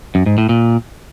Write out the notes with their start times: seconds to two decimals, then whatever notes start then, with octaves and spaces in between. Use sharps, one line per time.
0.15 F#2
0.26 G#2
0.38 A2
0.49 A#2